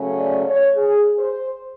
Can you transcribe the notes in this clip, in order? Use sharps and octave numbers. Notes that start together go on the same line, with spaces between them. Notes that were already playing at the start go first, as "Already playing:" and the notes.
Already playing: C#3 F#3 A3 C#4
D5
C#5
G#4
C5